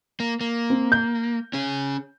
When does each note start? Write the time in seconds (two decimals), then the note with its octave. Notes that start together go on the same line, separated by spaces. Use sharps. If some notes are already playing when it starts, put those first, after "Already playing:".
0.20 A#3
0.41 A#3
0.70 C4
0.92 G6
1.53 C#4 G#4